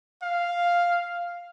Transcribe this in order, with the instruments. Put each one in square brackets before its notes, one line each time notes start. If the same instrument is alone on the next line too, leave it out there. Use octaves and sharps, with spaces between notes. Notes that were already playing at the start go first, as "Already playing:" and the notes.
[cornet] F5